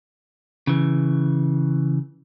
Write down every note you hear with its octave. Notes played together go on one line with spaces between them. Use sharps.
C#3 E3